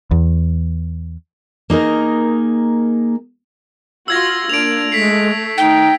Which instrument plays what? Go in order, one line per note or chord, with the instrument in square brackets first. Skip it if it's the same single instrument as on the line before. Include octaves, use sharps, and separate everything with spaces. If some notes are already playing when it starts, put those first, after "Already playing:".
[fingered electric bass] E2
[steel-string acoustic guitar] A#3 D#4 G#4 A#4
[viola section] F4 F#4 [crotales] E6 G#6 A#6
[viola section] A#3 D4 F4 [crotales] D7 F7
[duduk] G#3 [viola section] A3 [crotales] B6 C7
[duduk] D#4 [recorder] G5